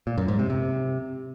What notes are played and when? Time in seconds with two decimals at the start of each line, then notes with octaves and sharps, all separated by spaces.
0.07 A#2
0.18 F#2
0.28 G#2
0.39 C3
0.50 C3